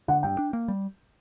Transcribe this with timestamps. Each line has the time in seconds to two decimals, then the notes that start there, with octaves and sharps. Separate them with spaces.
0.08 D3 F#5
0.23 G2 G5
0.39 D4
0.53 A#3
0.68 G3